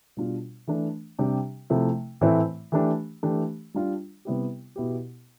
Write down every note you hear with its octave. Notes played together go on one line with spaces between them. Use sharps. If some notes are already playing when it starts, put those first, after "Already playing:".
B2 G3 D4 F4
E3 A3 D4
C3 G3 D4 G4
C3 F3 A3 E4
A2 E3 A3 C4 E4
E3 A3 D4 G4
E3 A3 D4 G4
G3 D4 F4
C3 G3 B3 E4 G4
B2 B3 E4 G4